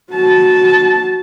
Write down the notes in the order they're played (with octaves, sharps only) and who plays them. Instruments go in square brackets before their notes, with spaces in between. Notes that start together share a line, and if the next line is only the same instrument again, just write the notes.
[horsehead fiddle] F#4 A5